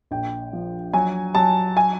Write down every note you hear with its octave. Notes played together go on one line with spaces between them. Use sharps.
A#1 G5
F3
F#3 G#5
F#3 A5
G#5